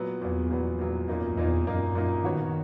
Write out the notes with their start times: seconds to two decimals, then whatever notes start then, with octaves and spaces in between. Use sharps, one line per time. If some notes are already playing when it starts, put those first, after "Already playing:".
Already playing: A#2 F#3 B3
0.22 E2 A#2 F#3 B3
0.50 A#2 F#3 B3
0.79 A#2 F#3 B3
1.08 F#2 A#2 A#3 D#4
1.37 E2 A#2 A#3 D#4
1.67 F#2 A#2 A#3 D#4
1.95 F#2 A#2 A#3 D#4
2.24 D#3 B3 F#4 C#5